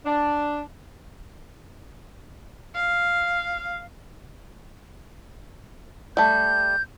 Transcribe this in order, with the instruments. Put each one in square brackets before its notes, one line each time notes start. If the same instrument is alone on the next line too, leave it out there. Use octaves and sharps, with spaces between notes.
[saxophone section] D4
[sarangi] F5
[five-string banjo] G3 A3 [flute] G6